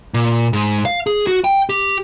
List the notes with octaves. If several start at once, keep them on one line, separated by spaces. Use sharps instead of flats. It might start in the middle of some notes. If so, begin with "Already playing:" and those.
A#2
G#2
F5
G#4
F#4
G5
G4